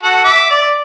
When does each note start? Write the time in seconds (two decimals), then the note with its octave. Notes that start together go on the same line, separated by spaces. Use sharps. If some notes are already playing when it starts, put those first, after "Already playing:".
0.03 F#4 A4 F#5
0.24 E5 D6
0.50 D5